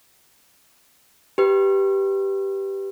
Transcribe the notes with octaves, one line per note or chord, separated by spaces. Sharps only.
G4 B4